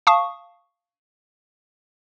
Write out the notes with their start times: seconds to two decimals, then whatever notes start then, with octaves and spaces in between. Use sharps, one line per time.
0.07 F5 A5 C#6 D#6